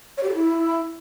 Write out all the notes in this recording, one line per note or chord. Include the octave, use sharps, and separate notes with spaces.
C#5
G4
A4
E4